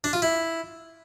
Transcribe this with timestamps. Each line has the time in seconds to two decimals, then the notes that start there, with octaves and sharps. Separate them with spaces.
0.04 D4
0.13 F4
0.22 E4